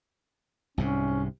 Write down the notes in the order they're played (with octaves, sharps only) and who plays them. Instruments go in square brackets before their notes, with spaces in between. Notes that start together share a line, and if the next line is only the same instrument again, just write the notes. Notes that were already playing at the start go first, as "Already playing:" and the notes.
[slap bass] C2 G#2 C3 [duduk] C#4